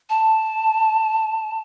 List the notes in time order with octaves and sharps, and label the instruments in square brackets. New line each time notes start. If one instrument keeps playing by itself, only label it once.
[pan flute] A5